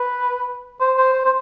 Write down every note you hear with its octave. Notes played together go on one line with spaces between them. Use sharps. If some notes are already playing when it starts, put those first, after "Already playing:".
Already playing: B4
C5
C5
C5
C5